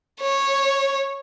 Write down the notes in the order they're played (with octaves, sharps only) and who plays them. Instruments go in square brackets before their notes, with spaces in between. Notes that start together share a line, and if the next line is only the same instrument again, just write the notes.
[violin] C#5